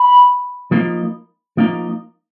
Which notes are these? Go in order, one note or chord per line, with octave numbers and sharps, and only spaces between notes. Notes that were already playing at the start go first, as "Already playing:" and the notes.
Already playing: B5
F3 A#3 D#4
F3 A#3 D#4